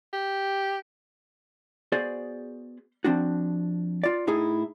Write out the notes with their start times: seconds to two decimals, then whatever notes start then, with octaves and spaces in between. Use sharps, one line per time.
0.13 G4
1.92 B3 F#4 G#4 C5 D5
3.04 F3 C4 D4 F#4
4.03 F4 D5
4.27 A2 D#4 E4 G#4